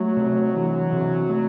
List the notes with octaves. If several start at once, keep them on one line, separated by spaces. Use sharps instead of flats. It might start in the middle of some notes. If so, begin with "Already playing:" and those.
Already playing: F#3 A3
C3
E3
C3
A3